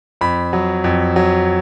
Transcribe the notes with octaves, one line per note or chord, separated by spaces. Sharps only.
F2 B5
F#3
F2
F#3